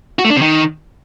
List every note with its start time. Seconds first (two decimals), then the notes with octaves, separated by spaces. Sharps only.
0.19 F#4
0.24 A3
0.30 D4
0.36 C3
0.42 D#3